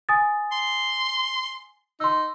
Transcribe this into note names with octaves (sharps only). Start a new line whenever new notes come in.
G#5 D#6 A6
C6
D#4 C6 E6